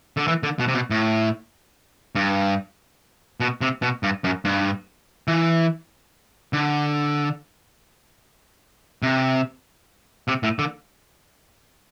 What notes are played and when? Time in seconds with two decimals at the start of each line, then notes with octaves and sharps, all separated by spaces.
0.17 D3
0.28 E3
0.43 D3
0.59 B2
0.68 C3
0.74 B2
0.90 A2
2.15 G2
3.40 B2
3.61 C3
3.82 B2
4.03 G2
4.24 F#2
4.45 G2
5.28 E3
6.53 D3
9.03 C3
10.28 C3
10.43 A2
10.59 D3